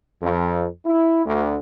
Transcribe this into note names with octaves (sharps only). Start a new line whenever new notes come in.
F2
E4
D2